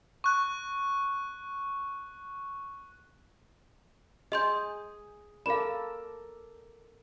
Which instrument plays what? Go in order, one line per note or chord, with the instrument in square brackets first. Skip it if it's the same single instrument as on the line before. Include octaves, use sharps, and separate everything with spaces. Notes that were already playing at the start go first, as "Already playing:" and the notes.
[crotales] C#6 F#6
[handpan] G#4 [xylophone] D#5 C6 G6
[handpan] A4 A#4 D5 [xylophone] F5 B5